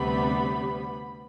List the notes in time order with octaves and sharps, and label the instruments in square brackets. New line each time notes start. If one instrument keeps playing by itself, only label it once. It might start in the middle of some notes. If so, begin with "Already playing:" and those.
Already playing: [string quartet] D2 C3 G3 B3 B5